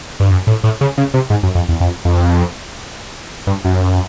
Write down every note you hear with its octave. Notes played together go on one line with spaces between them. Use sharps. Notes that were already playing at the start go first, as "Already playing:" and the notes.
G2
F#2
A2
A2
C#3
C#3
C3
G#2
F#2
F2
E2
F2
F2
G2
F#2